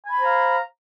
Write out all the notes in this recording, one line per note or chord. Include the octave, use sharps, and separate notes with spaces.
C5 F5 G#5 A#5 B5